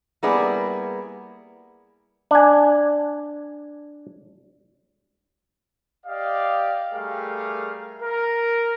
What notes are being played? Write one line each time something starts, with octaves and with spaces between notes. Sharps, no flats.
G3 A#3 B3 E4 G#4 D5
D4 G#5
G4 D5 D#5 F5
G3 A3 G4 G#4 A#4 F5
A#4